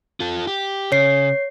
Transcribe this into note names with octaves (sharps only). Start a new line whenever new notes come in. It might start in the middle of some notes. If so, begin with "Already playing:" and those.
F4 A4
G4
C#3 C#5 C7